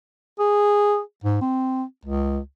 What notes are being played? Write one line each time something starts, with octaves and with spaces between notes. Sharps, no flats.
G#4
G#2
C4
C#2